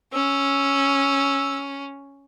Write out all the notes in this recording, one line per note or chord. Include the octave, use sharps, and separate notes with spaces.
C#4 E6